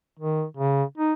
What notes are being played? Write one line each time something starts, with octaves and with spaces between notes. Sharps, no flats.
D#3
C#3
D#4